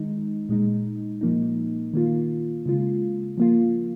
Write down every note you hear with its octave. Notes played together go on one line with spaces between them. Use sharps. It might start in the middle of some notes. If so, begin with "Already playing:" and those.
Already playing: D#3 G#3 D#4
A#2 G#3 D#4
A#2 F3 A#3 D#4
D#3 A#3 F4
C#3 G#3 F4
F3 A#3 F4